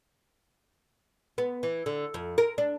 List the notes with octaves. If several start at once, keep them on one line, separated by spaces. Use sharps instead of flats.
B3
E3
D3
F2
A#4
D4